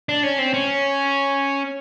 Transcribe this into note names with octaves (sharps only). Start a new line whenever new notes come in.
D4
C#4
C4
C#4